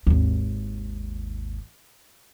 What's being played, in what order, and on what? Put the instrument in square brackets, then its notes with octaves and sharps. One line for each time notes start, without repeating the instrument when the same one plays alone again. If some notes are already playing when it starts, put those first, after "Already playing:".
[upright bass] G#1 D#2